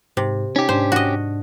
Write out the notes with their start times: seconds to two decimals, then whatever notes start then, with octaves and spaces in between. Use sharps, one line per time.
0.17 G#2 C3
0.56 C#4 D#4 G4
0.69 G#2 D4 C5
0.92 F#4 D#5